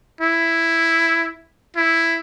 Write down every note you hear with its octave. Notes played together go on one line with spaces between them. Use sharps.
E4
E4